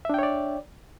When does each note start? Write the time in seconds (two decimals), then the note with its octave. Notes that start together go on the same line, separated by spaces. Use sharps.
0.05 E5
0.09 D4
0.14 G5
0.19 C#5
0.23 D5